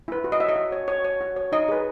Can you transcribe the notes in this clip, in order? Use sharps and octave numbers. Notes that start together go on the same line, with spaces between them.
E4 B4
F#4
D#5
C#5 E5
D#5
F#4
C#5
F#4 C#5
C#5
F#4
C#5
D#4 D#5
G#4 B4